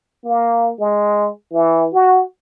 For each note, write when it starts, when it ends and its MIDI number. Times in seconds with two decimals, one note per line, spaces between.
0.25 0.71 58
0.80 1.28 56
1.54 1.88 52
1.93 2.22 66